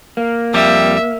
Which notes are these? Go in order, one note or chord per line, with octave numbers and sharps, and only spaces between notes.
A#3
F2 G3 E5